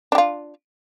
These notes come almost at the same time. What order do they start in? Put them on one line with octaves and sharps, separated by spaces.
D4 G4 F4